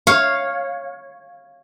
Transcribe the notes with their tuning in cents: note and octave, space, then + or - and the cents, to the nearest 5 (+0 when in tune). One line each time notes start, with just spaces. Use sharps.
C#5 -10 F5 +0